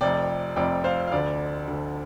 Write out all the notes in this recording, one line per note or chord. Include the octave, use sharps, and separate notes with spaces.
F1 F2 C3 D5 G5
F1 F2 C3 D5 G5
C5 F5
F5
D2 D3 D5
D2 D3